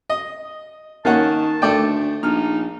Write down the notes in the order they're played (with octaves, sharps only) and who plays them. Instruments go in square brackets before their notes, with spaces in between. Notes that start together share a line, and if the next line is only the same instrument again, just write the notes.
[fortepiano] D#5
[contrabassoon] D#3 [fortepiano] A#3 C#4 F#5 [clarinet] A5
[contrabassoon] D2 [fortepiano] A3 D5 G5
[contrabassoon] A#1 [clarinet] D#4 [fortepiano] F6